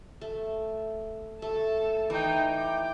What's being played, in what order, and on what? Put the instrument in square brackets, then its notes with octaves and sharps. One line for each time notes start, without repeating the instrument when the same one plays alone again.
[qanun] A3
[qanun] A3 [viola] A4 A5
[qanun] E3 [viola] D#4 G5
[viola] G5 D6